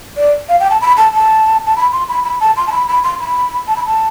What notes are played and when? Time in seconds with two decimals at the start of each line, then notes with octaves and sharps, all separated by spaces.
0.17 D5
0.49 F5
0.60 G5
0.70 A5
0.81 B5
0.97 A5
1.13 A5
1.66 A5
1.76 B5
1.92 C6
2.09 B5
2.24 B5
2.40 A5
2.57 C6
2.67 A5
2.72 B5
2.88 B5
3.04 C6
3.20 B5
3.68 A5
3.76 B5
3.86 A5